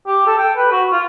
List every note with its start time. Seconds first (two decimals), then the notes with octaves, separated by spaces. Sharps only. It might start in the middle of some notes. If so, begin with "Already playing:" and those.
0.07 G4
0.27 A4
0.39 G5
0.57 B4
0.72 F#4
0.92 F4